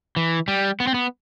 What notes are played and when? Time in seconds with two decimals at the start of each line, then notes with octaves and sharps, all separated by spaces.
0.16 E3
0.48 G3
0.80 B3
0.87 C4
0.94 B3